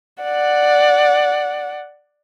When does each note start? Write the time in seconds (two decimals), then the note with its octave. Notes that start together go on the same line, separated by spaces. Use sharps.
0.23 D5 F#5